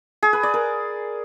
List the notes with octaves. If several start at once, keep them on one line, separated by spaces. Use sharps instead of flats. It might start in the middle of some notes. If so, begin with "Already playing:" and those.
G#4
B4
D5
A#4